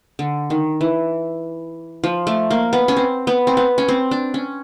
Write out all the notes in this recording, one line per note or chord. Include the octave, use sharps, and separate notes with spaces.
D3
D#3
E3
F3
A3
A#3
B3
C#4
C4
B3
C4
B3
C#4
C4
D4
C#4